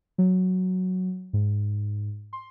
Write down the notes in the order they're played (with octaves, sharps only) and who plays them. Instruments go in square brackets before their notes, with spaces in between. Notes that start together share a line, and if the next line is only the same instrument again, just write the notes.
[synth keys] F#3
G#2
C6